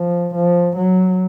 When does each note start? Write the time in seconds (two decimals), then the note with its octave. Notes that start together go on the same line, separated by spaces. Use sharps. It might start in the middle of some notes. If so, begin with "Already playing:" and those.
Already playing: F3
0.35 F3
0.77 F#3